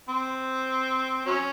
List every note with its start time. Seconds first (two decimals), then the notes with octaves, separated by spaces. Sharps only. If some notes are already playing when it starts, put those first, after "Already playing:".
0.09 C4
1.26 F#3 C#4